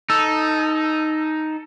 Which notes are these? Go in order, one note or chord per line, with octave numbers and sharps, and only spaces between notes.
D#4 A4